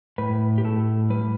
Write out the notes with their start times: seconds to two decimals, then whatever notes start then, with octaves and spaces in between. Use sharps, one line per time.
0.18 A2 B4
0.58 G4
0.64 A2 A4
1.10 G3 B4